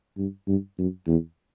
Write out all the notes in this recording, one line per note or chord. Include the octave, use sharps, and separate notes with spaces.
G2
G2
F#2
E2